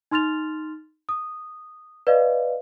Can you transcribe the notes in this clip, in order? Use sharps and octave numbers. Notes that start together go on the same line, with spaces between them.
D#4 C6 F6 A6 F7
D#6
B4 D5 D#5 F5